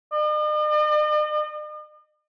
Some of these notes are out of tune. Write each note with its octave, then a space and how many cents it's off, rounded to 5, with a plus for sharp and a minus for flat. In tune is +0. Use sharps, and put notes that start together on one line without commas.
D#5 -45